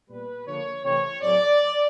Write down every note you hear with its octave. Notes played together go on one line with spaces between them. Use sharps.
A#2 G3 B3 B4
D3 F3 A#3 C#5
C3 E3 A3 C4 C#5
A2 F#3 A3 C4 D5